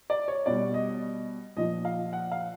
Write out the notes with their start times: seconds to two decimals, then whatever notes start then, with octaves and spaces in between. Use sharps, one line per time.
0.10 D5
0.28 C#5
0.46 B2 G3 D5
0.74 D#5
1.57 A#2 F3 D#5
1.85 F5
2.13 F#5
2.32 F5